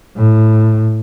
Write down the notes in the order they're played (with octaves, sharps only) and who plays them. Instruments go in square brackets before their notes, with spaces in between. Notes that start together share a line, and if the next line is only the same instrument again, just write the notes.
[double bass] A2